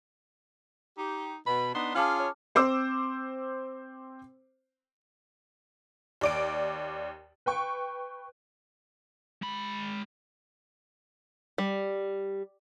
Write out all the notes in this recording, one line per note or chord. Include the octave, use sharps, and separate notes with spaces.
D#4 G4
B2 B5
B3 D4 D#4 C6
C#4 F4 G#4 F5 A5 D6 F6
C#5
C4 C5 D6 E6
D#2 D5 D7
B4 G5 C#6
G#3 B5
G3